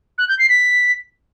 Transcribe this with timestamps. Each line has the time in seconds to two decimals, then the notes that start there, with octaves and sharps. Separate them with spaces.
0.18 F#6
0.29 G6
0.39 C7
0.49 B6